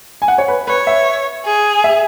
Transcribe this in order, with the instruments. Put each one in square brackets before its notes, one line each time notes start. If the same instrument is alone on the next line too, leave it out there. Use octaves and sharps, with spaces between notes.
[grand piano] G#5
F#5
C#5
B4
[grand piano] B4 [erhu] C#5
[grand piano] E5
[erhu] G#4
[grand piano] E5